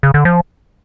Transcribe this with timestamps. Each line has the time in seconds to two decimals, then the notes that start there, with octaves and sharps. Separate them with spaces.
0.03 C#3
0.14 D3
0.25 F3